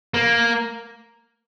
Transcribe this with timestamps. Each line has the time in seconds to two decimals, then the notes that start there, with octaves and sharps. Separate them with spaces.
0.14 A#3